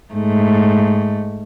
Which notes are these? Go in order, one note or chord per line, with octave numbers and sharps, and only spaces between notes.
G#2 A3